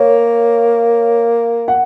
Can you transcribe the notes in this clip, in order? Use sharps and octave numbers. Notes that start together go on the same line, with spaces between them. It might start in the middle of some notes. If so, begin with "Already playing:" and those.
Already playing: A#3 C#5
F#5